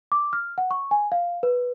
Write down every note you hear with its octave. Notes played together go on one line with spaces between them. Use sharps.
D6
F6
F#5
C#6
G#5
F5
B4